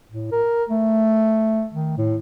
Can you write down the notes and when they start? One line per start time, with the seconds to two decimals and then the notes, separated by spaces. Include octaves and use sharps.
0.11 A2
0.32 A#4
0.69 A3
1.73 D#3
1.98 A2